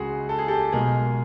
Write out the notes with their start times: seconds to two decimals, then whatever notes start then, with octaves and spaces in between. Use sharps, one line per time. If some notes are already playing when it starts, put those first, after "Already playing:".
Already playing: C#2 C#3 G#3 F#4 G#4
0.29 A4
0.38 G#4
0.48 G4 A4
0.72 B1 B2 G#3 G#4 A#4